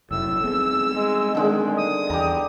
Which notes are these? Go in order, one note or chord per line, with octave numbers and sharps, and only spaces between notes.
F1 F#2 A2 E6
G3 B3 C4 G#4
G#3
D3 D#3 G#3
D#6
E2 G4 A#5